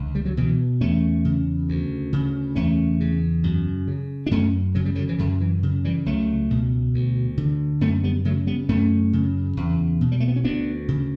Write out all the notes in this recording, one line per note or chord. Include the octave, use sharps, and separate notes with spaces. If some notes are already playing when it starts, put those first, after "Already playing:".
Already playing: C#2 D3
G3
F#3
B2 E3
E2 A3 C#4
C#3
D2
C#3
E2 A3 C#4
C#3
F#2
C#3
D4
F#2 A3 C#4
C#3 F#3
G3
D3 F#3
E3
F#2 D3
E3
C#3
E3 G3
C#2 F#3 A3
B2
D2
D3
F#2 A3 C#4
G3 B3
C#3 F#3 A3
G3 B3
F#2 A3 C#4
C#3
E2
B2
G3
A3
B3
C#4
D2 B3 D4
C#3